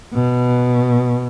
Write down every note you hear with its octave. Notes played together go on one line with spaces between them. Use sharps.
B2